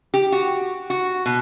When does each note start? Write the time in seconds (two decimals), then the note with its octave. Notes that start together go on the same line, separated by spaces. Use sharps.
0.14 G4
0.32 F#4
0.90 F#4
1.26 B2